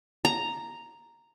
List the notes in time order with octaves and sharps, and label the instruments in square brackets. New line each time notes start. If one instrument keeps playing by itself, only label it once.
[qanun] A#5